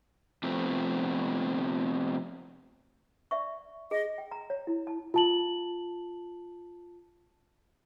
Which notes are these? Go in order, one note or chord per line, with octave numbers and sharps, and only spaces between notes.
C3 F3 A3 B3 C4
D5 E5 C#6
G#4 D#5
G5
A#5
C#5
E4
A5
F4 A5 F#7